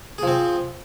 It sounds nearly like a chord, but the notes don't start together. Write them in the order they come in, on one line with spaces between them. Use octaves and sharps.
G#4 F3 C4